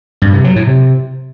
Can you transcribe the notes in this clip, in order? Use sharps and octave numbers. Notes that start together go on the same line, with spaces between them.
G2
C3
F#3
A2
C3